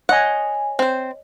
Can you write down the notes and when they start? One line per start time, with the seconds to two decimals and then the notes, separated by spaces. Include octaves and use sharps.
0.09 C#5 D#5 F#5 G#5
0.79 C4 C5